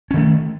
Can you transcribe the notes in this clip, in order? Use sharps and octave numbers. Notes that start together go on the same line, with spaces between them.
D#3 A3 C#4